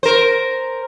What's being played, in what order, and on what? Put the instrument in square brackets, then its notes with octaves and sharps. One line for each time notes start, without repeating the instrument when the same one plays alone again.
[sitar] A#4 C5